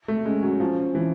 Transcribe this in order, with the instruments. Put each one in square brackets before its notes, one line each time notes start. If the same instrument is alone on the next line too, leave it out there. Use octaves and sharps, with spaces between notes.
[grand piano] A3
[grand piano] G#3 [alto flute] C#4
[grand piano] F#3
F3
E3